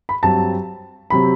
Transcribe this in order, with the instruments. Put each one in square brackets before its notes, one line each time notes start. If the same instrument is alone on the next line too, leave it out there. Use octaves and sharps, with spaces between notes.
[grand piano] B5
G2 F#3 C4 A5
C3 F#3 C4 B5